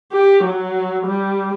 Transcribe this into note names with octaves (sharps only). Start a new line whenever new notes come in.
G4
F#3
G3